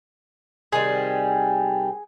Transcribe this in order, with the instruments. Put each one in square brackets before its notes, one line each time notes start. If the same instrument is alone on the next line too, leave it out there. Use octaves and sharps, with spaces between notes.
[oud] C3 D#3 G3 [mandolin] G#4